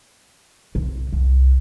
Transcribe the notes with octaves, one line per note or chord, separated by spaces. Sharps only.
C2
C2